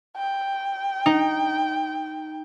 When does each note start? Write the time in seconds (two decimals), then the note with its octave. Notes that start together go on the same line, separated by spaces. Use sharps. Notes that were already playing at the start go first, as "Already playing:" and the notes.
0.17 G5
1.06 D#4